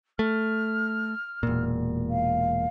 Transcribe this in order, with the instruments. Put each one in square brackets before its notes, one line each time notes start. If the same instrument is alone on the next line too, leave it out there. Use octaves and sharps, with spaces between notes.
[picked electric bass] A3 [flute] F6
[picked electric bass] E1 A#2
[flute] F5